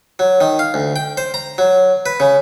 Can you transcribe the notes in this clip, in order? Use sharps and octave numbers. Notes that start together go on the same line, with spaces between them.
F#3
D#3
F5
D2
G5
C5
A#5
F#3
B4
C#3